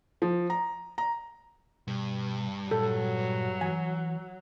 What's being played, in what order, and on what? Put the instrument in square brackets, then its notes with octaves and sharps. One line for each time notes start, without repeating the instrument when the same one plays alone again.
[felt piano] F3
A#5
A#5
[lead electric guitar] G2 [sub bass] B2
[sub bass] A#2 [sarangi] F#3 [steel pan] A4
[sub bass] E3 [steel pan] G#5